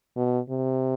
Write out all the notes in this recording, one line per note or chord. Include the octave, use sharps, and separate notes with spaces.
B2
C3